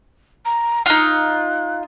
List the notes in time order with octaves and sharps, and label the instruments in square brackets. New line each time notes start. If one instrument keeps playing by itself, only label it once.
[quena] A#5
[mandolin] D#4 F4 [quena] F#6